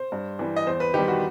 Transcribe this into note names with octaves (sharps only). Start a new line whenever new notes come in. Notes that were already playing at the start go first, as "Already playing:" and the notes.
Already playing: C5
G2
E3 G3
D#5
E2 C5
B4
D#3 G3 G4
F#4